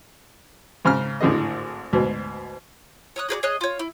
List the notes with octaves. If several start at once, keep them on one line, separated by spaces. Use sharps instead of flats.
G#2 C#3 A#5 F6
G#1 A2 D3 G#4 D#5
D2 G#2 B2
C#5 D#6 F#6
F#4 G#4 B4 D5
G#4 C#5 D#5 F#6
F4 C#5
E4